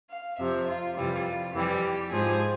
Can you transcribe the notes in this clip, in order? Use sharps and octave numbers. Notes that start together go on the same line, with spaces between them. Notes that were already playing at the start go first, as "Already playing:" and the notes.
F5
F2 C3 F3 E5
F4
F2 C3 E3 G3 F4
F2 E3 G3 G4
G#2 F3 G#4